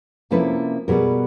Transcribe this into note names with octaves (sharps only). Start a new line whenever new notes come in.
C3 F3 A#3 C#4 E4 A4 B4
B2 G3 B3 G#4 A#4